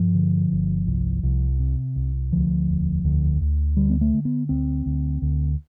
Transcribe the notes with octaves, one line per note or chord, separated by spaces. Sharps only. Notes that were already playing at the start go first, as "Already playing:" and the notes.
Already playing: G2 F3
D3
G1
C2
C2
C3
C2
D2 F3
E1
D2
D2
D3 G3
B3
A3
D3
B3
D2 C4
D2
D2